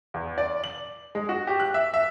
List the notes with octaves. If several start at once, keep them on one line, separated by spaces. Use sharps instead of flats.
E2
D5
F#7
G#3
F#4
G4
F#6
E5
E5